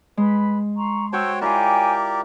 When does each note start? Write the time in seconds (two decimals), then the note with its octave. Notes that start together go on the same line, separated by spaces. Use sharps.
0.17 G#3 B4 B5
0.76 A#5 C6 C#6
1.13 F#4 C5 C#5 G5 A5 E6
1.41 E4 F4 G4 A#4 C#5 D5 G5 G#5